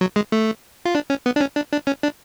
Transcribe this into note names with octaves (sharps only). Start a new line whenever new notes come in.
F#3
G#3
A3
F4
D4
C#4
B3
D4
C#4
D4
D4
C#4
D4